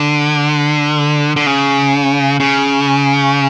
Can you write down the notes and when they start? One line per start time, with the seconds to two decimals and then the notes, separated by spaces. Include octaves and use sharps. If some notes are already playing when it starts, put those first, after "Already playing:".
Already playing: D3
1.36 D3
1.46 C#3
2.40 C#3